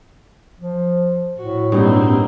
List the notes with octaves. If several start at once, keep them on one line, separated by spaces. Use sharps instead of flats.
F3
A2 F#4
G2 B2 A#3 C4 D#4